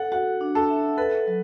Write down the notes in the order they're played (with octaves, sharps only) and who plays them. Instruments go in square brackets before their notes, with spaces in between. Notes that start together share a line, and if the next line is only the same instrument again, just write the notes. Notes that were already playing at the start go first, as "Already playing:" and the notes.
Already playing: [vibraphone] A4 [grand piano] F#5
[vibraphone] F#4 [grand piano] F#5
[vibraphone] D4
[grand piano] A4
[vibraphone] E5
[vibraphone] A4 [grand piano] B4
[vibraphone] F#3